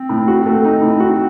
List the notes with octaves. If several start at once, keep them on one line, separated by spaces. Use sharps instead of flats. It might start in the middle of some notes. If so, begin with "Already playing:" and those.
Already playing: C4
A2
F#4
A3
D#4
A2
F#4